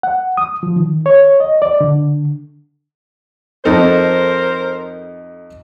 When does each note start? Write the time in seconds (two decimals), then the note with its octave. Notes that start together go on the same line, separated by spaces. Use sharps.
0.03 F#5
0.37 D#6
0.63 F3
0.76 D#3
1.06 C#5
1.40 D#5
1.62 D5
1.81 D3
3.65 F2 D#4 A4 A#4 C5